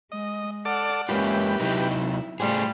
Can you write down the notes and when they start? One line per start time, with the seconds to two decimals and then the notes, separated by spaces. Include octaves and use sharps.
0.12 G#3 D#5
0.65 A4 D5 F#5 D6 F6
1.09 G#3 A#3 C#4 F4 G4 B4 E5
1.60 C3 F#3 D#4 E4
2.40 A2 C#3 G3 A3 F4 G#4 C5